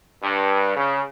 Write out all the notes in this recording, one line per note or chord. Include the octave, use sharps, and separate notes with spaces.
G2
C#3